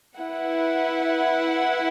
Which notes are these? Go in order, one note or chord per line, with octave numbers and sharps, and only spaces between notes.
E4 B4 F#5